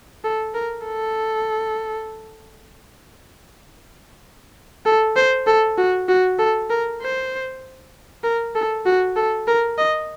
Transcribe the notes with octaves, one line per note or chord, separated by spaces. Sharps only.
A4
A#4
A4
A4
C5
A4
F#4
F#4
A4
A#4
C5
A#4
A4
F#4
A4
A#4
D#5